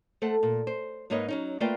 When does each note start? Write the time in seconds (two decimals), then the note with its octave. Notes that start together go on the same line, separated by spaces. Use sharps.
0.22 A3 A4 C5 F#5
0.43 A#2
0.67 C5
1.10 G#2 A#3 D#4 B4 C#5 D#5
1.28 F#3 C#4 D#4
1.60 A3 A#3 F4 B4 D5 G5